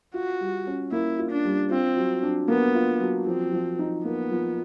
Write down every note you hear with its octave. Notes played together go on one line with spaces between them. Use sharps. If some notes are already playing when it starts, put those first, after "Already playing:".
F4 F#4
G3
C#4
A#3 E4
F4
D4
G3
C4 F4
F#3
D4
A#3 B3
F4
F#3
F3 C4
F3
D#4
A#3 B3
F3